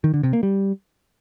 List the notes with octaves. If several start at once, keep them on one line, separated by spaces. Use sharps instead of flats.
D#3
D3
C3
A#3
G3